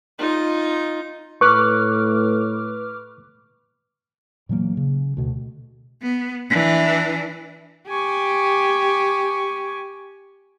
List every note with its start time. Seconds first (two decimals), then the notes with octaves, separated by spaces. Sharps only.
0.19 D#4 F4
1.41 A2 B4 C#6 D6 F6 F#6
4.49 A#2 E3 F#3 A#3
4.77 C#3
5.17 D2 B2
6.02 B3
6.49 E3 D4
7.90 G4 G#5 C#6